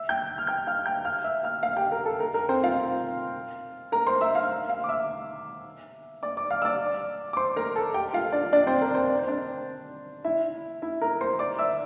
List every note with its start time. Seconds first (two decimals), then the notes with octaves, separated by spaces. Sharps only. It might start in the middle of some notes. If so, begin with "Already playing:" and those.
Already playing: E5 E6
0.09 G5 G6
0.38 F6
0.47 G5 G6
0.67 F5 F6
0.86 G5 G6
1.05 F5 F6
1.24 E5 E6
1.43 F5 F6
1.63 F5 F6
1.77 G4 G5
1.92 A#4
2.05 A4
2.20 A#4
2.34 A#4
2.49 C4 C5
2.63 F4 F5
3.92 A#4 A#5
4.07 C5 C6
4.21 E5 E6
4.35 F5 F6
4.69 F5 F6
4.84 D6
4.89 E5 E6
6.23 D5 D6
6.37 D5 D6
6.51 F5 F6
6.62 E6
6.65 D5 D6
7.33 D6
7.37 C5 C6
7.56 A#4 A#5
7.76 A4 A5
7.94 G4 G5
8.13 F4 F5
8.32 D4 D5
8.53 D4 D5
8.67 C4 C5
8.81 A#4
8.95 C4 C5
9.10 D5
9.19 C5
9.28 D4 D5
10.25 E4 E5
10.82 E4 E5
11.01 A#4 A#5
11.21 C5 C6
11.39 D5 D6
11.59 E5 E6